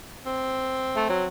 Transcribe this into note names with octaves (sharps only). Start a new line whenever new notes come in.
C4
A3
F#3